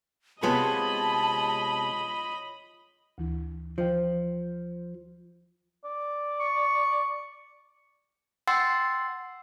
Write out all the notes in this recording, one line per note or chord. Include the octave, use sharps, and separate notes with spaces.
C3 G#3 B3 F4 C#5 D#5 A5 B5
D2 E3 E4
F3 C5 D#5 G5
D5
C#6
F#5 G5 C6 E6 A6 C7